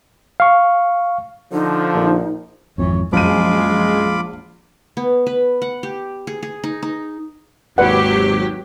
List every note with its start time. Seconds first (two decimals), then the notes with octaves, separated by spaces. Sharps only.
0.40 F5 C#6
1.52 D3 F3 D#4
1.95 A#1
2.78 G#1 F2 E3 C#5
3.13 A#1 F#2 G#3 F4 B5 D6 D#7
4.97 B3
5.26 B4
5.62 F#5
5.83 G4
6.27 G#4
6.43 G#4
6.64 D#4
6.83 D#4
7.78 G#1 D#2 F#3 G4 B4 D5 F#5